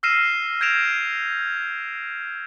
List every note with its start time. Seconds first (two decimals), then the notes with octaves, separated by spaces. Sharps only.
0.03 E6 F6 A#6 C7 D#7 E7
0.61 G6 G#6 A#6 D7 E7 F7